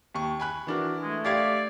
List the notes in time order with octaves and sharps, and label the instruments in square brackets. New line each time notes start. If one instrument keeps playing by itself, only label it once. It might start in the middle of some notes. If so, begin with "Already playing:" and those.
[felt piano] D#2 C#6
G#5 B5 F#6
[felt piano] E3 D4 A#4 [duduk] F#4
[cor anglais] G#3 [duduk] A3
[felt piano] G4 F5 G#6 [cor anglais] D5